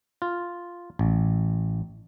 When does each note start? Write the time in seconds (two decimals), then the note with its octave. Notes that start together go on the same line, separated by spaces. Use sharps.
0.22 F4
0.99 A1